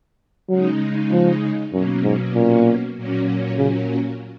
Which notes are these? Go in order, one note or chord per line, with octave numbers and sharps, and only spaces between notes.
C#3 F#3 G#3 D#4
F3
F#2 B2 F#3 A#3 C#4
G#2
A#2
A#2 F#3 A#3 C#4
C#3